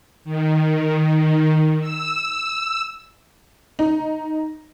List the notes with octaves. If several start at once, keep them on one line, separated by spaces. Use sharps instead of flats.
D#3
E6
D#4